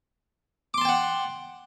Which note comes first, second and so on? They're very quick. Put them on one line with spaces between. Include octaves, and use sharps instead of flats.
D6 C6 A5 G5 F#5